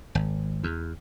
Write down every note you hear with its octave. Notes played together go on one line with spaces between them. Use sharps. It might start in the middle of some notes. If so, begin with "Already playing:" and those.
G#1
E2